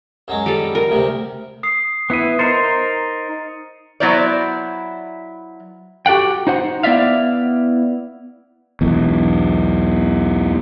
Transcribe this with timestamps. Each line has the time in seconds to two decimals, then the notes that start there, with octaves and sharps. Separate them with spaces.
0.28 F#2 F#3 G#3
0.46 G3 A4
0.75 A#4
0.91 D2 C3
1.63 D#6 C7
2.10 B3 E4 C#7 D#7
2.39 D#4 A#4 C5 A6 C#7
4.00 F#3 B3 E4 C5 D5
6.06 F#4 G4 A4 F#5 G5
6.47 D#4 C5 F#5
6.83 B3 E4 D5 E5 F5
8.81 B1 E2